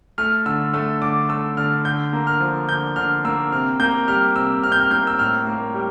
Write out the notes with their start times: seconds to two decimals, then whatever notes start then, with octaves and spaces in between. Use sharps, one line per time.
0.18 A3 F6
0.46 D3 E6
0.74 A3 E6
1.02 D3 D6
1.29 A3 E6
1.57 D3 F6
1.85 D3 G6
2.13 A#3
2.27 F6
2.40 F3
2.69 D3 G6
2.96 D3 F6
3.25 A#3 E6
3.52 C3 F6
3.80 A#3 G6
4.08 G3 F6
4.35 C3 E6
4.64 C3 F6
4.72 G6
4.80 F6
4.91 A#3 G6
5.07 E6
5.19 A2 F6
5.47 A#3
5.74 G3